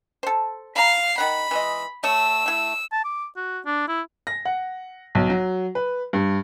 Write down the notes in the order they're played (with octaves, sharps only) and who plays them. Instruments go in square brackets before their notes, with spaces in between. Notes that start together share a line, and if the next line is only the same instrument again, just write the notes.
[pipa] A4 C5
[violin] F5 C7 [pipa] A#5 B5
[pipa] D#3 F#5 [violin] B5
[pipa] E3 G#3 D#5
[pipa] A3 C#5 [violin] E6
[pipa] A3 E4
[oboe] A5
D6
F#4
D4
E4
[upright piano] A#6
F#5
B1
F#3
B4
G2